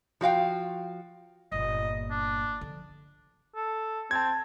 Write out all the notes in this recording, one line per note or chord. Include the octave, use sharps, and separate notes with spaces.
F3 F#4 F5 G5
G1 A#2 D#5
D4
D3 F3
A4
C4 A5 G#6